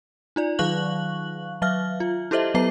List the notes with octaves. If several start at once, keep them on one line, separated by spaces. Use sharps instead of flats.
D#4 F4 D5
D#3 F#3 F5 C#6 F#6 F#7
F#3 E5 F5 F6
F4
E4 G4 A4 C5 D#5 E5
F#3 B3 A4 E5 A#5 C7